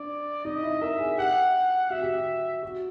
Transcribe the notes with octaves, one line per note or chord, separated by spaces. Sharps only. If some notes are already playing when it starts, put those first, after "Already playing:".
Already playing: D4 D5
D#4 D#5
E4
A#4 E5
G#4
G4 F#5
F#4 E5
G4
F#4
F#4